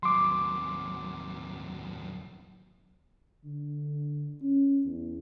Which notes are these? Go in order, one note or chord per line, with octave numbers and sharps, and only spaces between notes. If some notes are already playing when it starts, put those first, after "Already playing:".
D#2 F#3 C6 D6
D3
C#4
E2